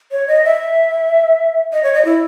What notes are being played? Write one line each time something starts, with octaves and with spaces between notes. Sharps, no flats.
C#5
D#5
E5
D#5
C#5
D#5
E4